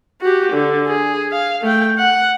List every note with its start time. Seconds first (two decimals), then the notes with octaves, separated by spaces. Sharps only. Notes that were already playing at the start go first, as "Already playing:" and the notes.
0.21 F#4 G4
0.52 D3
0.87 G#4
1.32 F5
1.62 A3 G5
1.99 F#5